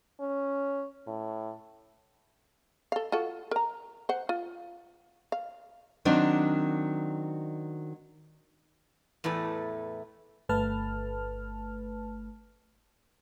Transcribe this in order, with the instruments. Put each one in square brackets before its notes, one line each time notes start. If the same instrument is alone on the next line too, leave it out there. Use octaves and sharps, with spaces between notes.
[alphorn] C#4
A2
[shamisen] A4 F5
F4 F#4 A4
A#4 A#5
C5 F#5
F4
F5
[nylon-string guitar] D#3 F#3 C4 D4
[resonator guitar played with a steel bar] E2 A2 A3 B4
[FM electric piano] G1 A3 B4 A5 F6